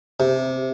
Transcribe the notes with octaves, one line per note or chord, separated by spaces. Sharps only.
C3